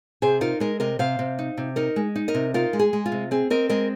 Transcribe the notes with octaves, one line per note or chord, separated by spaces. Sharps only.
C3 G#4 C5
D#4 F4 A#4
G#3 A#4 D#5
C3 A#4 D#5
C3 C5 F5
C3
D#4
C3
D#4 A#4 D#5
G#3
D#4
A#4 D#5
C3
D#4 F4 A#4
G#3
G#4
G#3
F4
C3
C4 G#4
C4 A#4 D#5
G#3 A#4 D#5